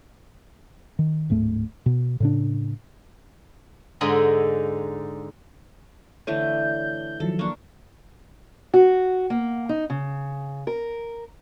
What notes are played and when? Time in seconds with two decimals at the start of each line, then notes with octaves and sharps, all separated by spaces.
0.99 D#3
1.30 D1 G#2 A3
1.86 B2
2.20 A2 C#3 D4
4.01 G#2 D3 D#4 D#5 E5 G#5
6.27 D3 E3 A3 C#5 G6
7.20 D#3 F3 F#3 A4
7.39 A#3 D4 C#6
8.74 F#4
9.30 A#3
9.69 D#4
9.90 C#3
10.67 A#4